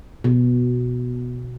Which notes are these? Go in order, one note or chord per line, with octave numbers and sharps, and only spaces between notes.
B2